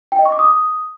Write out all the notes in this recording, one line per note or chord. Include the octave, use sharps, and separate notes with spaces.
G5
D#5
C#6
D6
D#6